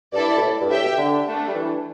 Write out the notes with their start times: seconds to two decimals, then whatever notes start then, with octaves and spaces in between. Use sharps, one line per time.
0.13 G2 E4 A4 D5
0.37 B2
0.41 A2
0.61 G2
0.70 A2 G4 E5 G5
0.84 B2
0.98 D3
1.27 A3 D4 A4
1.48 G3
1.54 E3